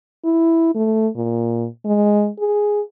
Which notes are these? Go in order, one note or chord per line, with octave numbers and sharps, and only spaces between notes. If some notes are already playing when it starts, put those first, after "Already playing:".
E4
A3
A#2
G#3
G#4